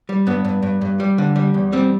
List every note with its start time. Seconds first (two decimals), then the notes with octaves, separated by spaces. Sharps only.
0.09 G3
0.27 G2 B3
0.45 G2
0.62 G2
0.81 G2
1.00 G3
1.18 D3
1.36 G3
1.54 E2
1.72 G3 C4